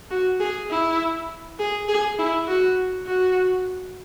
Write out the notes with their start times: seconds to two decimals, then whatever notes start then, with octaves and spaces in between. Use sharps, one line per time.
0.11 F#4
0.40 G#4
0.70 E4
1.59 G#4
1.88 G#4
2.19 E4
2.47 F#4
3.06 F#4